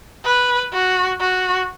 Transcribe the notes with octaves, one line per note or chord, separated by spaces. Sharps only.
B4
F#4
F#4